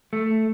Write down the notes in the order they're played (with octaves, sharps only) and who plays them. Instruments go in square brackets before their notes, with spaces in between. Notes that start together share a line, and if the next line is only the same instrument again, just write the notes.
[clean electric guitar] A3